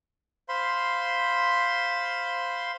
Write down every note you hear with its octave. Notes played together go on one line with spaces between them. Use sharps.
C5 F5 B5 C6